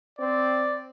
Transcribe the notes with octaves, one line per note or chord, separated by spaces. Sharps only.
C4 D5